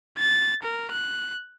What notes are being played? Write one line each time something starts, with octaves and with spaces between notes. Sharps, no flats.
A6
A#4
F#6